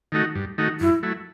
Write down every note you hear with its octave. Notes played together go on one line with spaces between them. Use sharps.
D#3 A3 D#4 F#4
G2
D#3 A3 D#4 F#4
F#2 E4
F#3 A3 E4